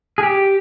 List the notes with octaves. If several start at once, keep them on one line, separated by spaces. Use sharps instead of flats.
G#4
G4